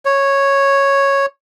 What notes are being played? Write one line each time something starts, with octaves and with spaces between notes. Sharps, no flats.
C#5